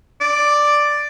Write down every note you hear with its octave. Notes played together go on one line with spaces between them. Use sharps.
D5